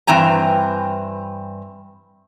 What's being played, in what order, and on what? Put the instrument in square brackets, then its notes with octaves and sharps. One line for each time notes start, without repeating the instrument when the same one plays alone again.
[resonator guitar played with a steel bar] G2 E3 C4 G#5 A#5